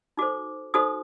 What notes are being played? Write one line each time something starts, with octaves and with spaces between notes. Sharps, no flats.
D#4 F#4 A4 C5 D6
D#4 F#4 A4 C5 D#6